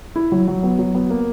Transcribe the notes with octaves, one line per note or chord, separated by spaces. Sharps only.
E4
F#3
F#3
B3
F#3
B3
A#3